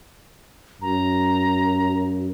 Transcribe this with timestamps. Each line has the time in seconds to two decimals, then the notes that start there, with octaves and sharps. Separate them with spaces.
0.82 F#2 A#5